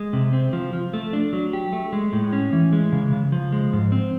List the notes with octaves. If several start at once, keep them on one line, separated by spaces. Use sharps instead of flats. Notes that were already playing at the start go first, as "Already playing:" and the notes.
Already playing: G#3
C3
C4
F3
F3
A3
D4
F#3
G4
A3
G#3
A2
C#4
E3
G#3
C#3
C#3
F3
G#3
G#2
C4